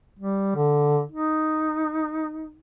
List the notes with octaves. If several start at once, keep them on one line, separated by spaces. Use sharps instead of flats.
G3
D3
D#4